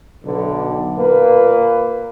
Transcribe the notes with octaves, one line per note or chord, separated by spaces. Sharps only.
B1 D3
A#2 A#3 B4